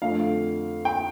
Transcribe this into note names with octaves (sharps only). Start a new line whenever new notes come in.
F2 D3 A3 F5
G5